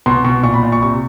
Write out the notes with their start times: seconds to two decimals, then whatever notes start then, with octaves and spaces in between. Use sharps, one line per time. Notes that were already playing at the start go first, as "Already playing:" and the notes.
0.06 B2 C6
0.24 B2 C#6
0.43 A#2 C#6
0.54 B5
0.63 A#2
0.72 C#6
0.82 C3 C#6